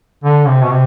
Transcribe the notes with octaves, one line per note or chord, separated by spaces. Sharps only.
D3
C3
B2
C3